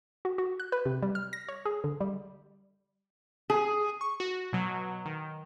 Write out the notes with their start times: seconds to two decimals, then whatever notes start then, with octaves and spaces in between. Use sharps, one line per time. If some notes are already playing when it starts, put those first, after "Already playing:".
0.25 F#4
0.38 F#4
0.60 F#6
0.72 B4
0.86 C3
1.02 G3
1.15 F6
1.33 A#6
1.48 C#5
1.65 G#4
1.84 D3
2.00 G3
3.50 G#4
4.01 C#6
4.20 F#4
4.53 B2 F#3
5.06 D#3